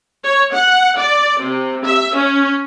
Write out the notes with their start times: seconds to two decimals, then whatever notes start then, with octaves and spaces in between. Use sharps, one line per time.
0.24 C#5
0.53 F#5
0.97 D5
1.40 C3
1.85 E5
2.16 C#4